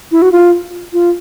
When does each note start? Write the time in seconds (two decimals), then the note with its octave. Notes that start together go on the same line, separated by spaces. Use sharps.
0.12 E4
0.22 F#4
0.32 F4
0.93 F4